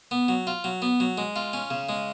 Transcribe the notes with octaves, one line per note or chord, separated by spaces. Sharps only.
B3
F#3
F4
F#3
B3
F#3
G#3
F4
C#4
C#3
G#3